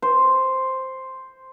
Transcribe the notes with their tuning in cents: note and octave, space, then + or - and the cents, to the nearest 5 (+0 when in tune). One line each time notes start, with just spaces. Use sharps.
C5 +0